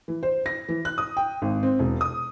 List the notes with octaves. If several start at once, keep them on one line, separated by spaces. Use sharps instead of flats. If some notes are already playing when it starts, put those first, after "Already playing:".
E3
C5
A#6
E3
F#6
D#6
G5
G#1
C4
E1
D#6